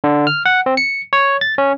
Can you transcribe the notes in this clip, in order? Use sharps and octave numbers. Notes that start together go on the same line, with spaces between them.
D3
F6
F#5
C4
C#7
C#5
A6
C#4